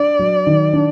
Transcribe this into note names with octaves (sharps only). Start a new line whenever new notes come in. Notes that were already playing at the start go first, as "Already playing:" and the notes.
Already playing: D4 D5
F#3
D#3
D4